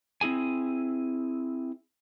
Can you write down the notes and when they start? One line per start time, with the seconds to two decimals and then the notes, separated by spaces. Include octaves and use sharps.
0.21 C4 E4 G#4 G#5